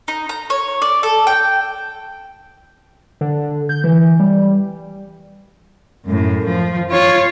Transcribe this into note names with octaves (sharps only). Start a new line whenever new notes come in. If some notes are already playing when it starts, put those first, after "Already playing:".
D#4
A#5
C#5
D5
A4
G5
D3
G6
E3
G3
F#2 A2
F3
F4 C#5